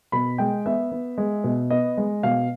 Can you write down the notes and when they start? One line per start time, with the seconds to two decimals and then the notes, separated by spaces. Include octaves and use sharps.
0.12 B2 B5
0.38 G#3 G5
0.66 B3 E5
0.92 B3
1.18 G#3
1.44 B2
1.70 B3 D#5
1.97 G#3
2.23 B2 F5